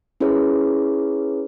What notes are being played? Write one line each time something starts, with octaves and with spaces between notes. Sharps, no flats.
C#4 E4 G#4 B4 C#5